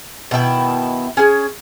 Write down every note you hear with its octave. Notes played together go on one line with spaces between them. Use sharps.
B2 D#3 E4 G5
C#4 G#4